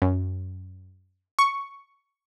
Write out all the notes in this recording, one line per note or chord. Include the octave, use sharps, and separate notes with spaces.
F#2
C#6